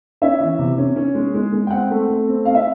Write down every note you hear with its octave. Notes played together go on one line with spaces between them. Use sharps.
C#4 E5
E3
C3
C#4
C#4
G#3
G#3
G#3
G5
C4 F#5
A3
A3
C4
C4 F5
E5